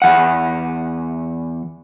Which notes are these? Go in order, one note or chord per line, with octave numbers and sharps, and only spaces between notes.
E2 F#5